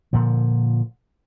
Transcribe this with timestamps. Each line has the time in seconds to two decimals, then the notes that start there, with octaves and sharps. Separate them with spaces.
0.13 A#2 D3 F3